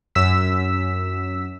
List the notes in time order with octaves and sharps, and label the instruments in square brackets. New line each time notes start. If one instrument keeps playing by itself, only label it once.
[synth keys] F#2 E6 B6